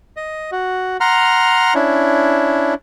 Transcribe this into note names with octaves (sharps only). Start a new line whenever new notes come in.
D#5
F#4
F#5 A#5 C6 F6
C#4 D4 E4